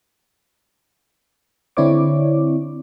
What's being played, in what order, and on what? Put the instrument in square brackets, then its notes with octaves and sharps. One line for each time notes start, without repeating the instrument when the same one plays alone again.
[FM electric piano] D3 C4 E4 C#5 D5 D6